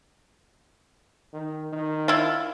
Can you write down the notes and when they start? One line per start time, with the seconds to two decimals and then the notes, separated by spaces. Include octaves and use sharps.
1.34 D#3
1.73 D#3
2.08 E4 F4